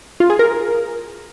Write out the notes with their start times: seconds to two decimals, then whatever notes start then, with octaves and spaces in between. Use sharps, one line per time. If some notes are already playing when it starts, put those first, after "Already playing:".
0.20 F4
0.30 G#4
0.39 A#4